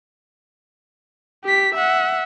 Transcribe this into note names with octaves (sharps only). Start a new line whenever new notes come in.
G4 B6
E5 F#5